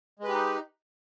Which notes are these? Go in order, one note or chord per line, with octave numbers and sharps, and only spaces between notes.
G#3 D#4 G4 B4